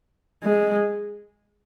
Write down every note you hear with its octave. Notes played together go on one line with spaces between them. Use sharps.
G#3